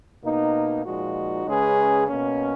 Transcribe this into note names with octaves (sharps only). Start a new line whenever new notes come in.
B2 A#3 D#4
A#2 F3 G#3 D#4 F#4
C#3 G#3 C#4 G#4 B4
B2 A#3 C#4